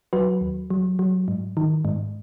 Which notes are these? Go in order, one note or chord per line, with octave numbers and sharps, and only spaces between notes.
F#3 F#4 B4
D#2
F#3
F#3
G#2
D#3
G#2